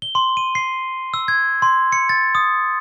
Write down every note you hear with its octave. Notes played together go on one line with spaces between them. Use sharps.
G7
C6
D#7
C7
E6
G#6
C6
C#7
A6
D#6